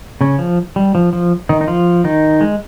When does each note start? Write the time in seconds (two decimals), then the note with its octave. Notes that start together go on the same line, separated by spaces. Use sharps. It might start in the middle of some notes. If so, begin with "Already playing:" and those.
0.21 C#3 C#4
0.39 F3
0.76 G3
0.95 F3
1.13 F3
1.49 D#3 D#4
1.61 D#4
1.68 F3 F4
2.04 D#3 D#4
2.41 G#3